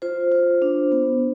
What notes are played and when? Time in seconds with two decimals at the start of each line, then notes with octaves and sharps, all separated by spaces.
0.02 F4 C5
0.32 F4
0.62 D4
0.92 B3